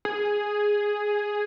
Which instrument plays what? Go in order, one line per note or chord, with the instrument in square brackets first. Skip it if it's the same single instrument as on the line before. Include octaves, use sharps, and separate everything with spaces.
[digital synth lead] G#4